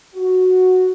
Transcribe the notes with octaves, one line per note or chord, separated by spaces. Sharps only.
F#4